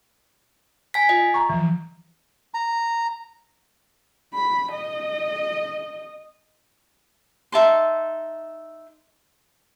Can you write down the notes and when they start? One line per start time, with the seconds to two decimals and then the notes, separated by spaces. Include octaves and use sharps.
0.94 G#5 B6
1.09 F4 D#5
1.34 A#5 C#6
1.50 E3 F3
2.54 A#5
4.34 B5
4.72 D#5
7.52 D#4 E5 A5 C6